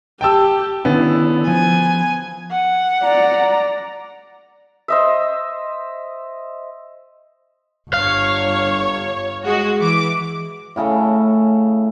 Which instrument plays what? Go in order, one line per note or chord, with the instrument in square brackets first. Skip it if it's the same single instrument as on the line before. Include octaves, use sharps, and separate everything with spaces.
[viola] G4 [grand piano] G5 A5 E6
[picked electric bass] D3 D#3 C#4 [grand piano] B3 [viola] E4
[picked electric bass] F3 [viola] G#5
[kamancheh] F#5
[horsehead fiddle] D5 A#5
[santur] C5 D#5 E5
[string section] G1 C#5 [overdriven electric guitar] F5
[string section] G#3 F#4
E3 D6
[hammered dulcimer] A2 C#3 A3 A4